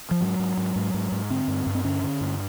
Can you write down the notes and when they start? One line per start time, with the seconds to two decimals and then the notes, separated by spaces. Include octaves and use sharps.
0.11 F3
0.21 G#2 F#3
0.39 G#2
0.57 G#2
0.76 G#2
0.94 G#2
1.12 G#2
1.30 D3 C4
1.48 G2
1.66 G2
1.75 C4
1.85 D3 C#4
2.03 D3
2.21 G2